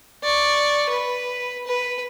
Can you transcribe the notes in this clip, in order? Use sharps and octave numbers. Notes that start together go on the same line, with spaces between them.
D5 C#6
B4
B4